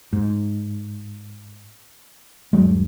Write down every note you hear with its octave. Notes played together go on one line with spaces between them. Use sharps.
G#2
D#1 G2 F#3 G#3